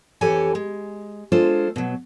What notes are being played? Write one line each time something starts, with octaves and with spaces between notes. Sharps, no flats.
F2 E3 G4 A4 C#5 G#5
G#3
G#3 D4 F4 A4 C5
B2 F#3